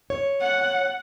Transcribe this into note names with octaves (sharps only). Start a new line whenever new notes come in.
C#5
F#5